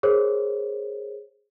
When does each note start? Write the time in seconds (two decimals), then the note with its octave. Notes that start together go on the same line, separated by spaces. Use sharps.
0.03 G#4 A#4 C5 C#5